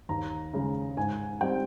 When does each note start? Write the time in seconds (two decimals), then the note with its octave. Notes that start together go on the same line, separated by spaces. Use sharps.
0.09 D#2 A#5
0.54 C#3 G#3
0.97 G#2 G#5
1.41 G3 C4 G5